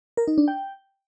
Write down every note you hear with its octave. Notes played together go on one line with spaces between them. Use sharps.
A#4
D#4
D4
G5